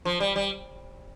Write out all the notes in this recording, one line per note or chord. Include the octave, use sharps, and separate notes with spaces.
F3
G3
G3